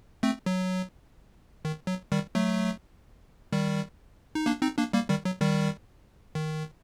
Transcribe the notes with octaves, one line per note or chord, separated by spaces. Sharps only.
A3 C4
F#3
D#3
F#3
D#3 G3
F#3 A3
D#3 G3
D#4
A#3 D4
C4 D#4
A#3 D4
G3 A#3
D#3 G3
F#3
D#3 G3
D#3